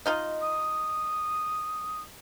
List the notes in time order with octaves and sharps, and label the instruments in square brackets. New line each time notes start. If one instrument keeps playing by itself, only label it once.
[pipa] D#4 F4 D#5
[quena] D#6